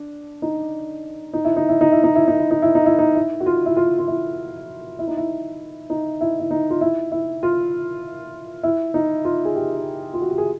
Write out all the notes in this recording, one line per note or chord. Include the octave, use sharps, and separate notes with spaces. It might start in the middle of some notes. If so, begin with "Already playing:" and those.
Already playing: D4
D#4
D#4
E4
D#4
E4
D#4
E4
D#4
E4
D#4
E4
D#4
E4
D#4
E4
D#4
E4
F#4
F4
E4
F4
F4
E4
E4
D#4
E4
D#4
E4
E4
D#4
F4
E4
E4
F4
E4
D#4
F4
G#4
G4
F4
F#4
G4
G#4